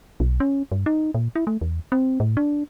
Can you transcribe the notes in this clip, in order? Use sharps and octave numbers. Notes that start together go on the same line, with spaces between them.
B1
C#4
G2
D#4
A#2
E4
A3
E2
C4
A2
D4